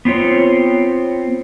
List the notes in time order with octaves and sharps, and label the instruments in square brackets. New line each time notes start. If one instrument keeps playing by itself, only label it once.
[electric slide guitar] B3 C4 F4 C#5